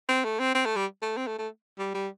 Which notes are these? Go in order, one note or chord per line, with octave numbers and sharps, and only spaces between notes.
C4
A3
C4
C4
A3
G3
A3
C4
A3
A3
G3
G3